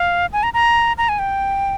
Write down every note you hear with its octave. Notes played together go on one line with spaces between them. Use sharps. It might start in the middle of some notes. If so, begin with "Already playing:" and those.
Already playing: F5
G#5
A#5
A#5
A#5
G#5
G5